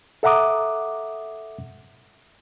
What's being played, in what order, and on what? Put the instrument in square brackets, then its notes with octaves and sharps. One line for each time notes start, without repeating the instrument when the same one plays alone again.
[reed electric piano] A4 E5 F#5 A#5 D6 D#6